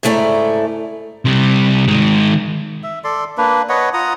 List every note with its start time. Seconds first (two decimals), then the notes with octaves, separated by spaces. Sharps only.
0.03 G#2 C#3 A3 E4 D5 A#5
1.25 C3 G3
1.88 D#3 G#3
2.83 E5
3.04 A4 D5 C6
3.38 A#3 D4 B4
3.69 B4 C#5 D#5 F#5
3.94 F4 F#5 A#5 D#6